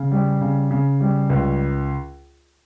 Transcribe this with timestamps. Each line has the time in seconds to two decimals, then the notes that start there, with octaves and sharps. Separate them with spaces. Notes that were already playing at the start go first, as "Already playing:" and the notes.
Already playing: C#3
0.11 G3
0.41 C#3
0.71 C#3
1.01 G3
1.30 C#2